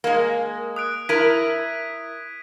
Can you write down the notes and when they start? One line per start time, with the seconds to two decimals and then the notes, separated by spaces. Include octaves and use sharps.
0.04 G#3 A#3
0.76 D#6 F#6 D7
1.09 E4 A#4 G#6 B6 D#7